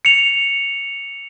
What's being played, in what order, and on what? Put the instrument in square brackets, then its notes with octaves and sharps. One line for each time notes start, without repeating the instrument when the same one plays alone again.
[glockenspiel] C#7 F7